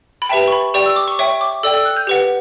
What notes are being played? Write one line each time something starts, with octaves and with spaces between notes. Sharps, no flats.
B5
G4 B4 E5 G5 A5
C#6
B5
G4 D5 G5 C#6
E6
D6
C#6
C#5 E5 G5 C#6
D6
A4 D5 G5 E6
E6
F#6
G6
G4 B4 F#5